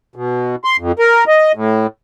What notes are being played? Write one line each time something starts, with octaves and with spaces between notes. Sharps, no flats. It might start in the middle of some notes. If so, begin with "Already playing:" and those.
B2
C6
F2
A#4
D#5
A2